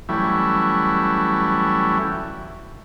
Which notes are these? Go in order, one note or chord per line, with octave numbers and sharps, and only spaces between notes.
E3 F#3 G3 A3 C#4 E4